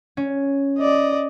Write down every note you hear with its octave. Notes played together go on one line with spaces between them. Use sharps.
C#4
D5 D#5